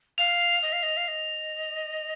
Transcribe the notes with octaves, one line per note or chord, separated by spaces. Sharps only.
F5 F7
D#5
F5
D#5
F5
D#5